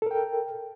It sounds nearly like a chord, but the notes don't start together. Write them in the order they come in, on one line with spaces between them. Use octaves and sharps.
A4 A#4 G5